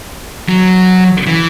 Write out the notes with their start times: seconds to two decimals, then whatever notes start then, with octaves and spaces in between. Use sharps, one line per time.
0.49 F#3
1.26 E3